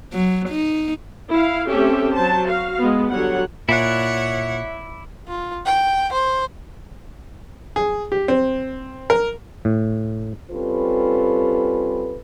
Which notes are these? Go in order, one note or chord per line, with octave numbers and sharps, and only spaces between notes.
F#3
D#4
E4 F5
A3 C4 C#4 G4 A4 E5
F#3 C5 A5
F#4 F5
G#3 B3
D3 F#3 G3 C#5 F#5
A#2 E4 C#5 D5 E5 F#5 F#6
F4
G5
C5
G#4
G4
C4
A#4
A2
G3 C4 C#4 F4 A4 B4